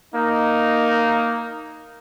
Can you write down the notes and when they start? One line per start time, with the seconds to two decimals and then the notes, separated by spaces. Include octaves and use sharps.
0.15 A#3 D#4